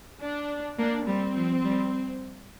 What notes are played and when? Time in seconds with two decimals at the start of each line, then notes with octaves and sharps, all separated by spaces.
0.21 D4
0.78 A#3 D4
1.07 G3 C4
1.36 F3
1.64 G3